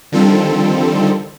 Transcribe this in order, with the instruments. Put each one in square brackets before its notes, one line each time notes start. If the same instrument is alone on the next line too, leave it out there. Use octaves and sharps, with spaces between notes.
[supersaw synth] D3 D#3 F3 G3 C4 A4